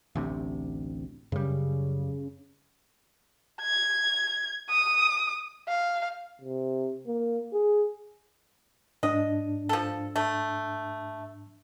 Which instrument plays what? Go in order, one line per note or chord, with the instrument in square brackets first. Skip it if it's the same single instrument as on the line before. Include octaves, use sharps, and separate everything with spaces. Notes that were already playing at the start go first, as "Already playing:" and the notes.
[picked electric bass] A1 D2 C3
[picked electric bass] F#2 G3 [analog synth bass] C#3
[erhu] G#6
D#6
F5
[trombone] C3
A#3
G#4
[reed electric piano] G#2 D4 [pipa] D#5
[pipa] F3 A4
A3